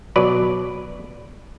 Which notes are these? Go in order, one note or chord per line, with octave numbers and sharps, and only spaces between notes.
B2 F#3 B4 D5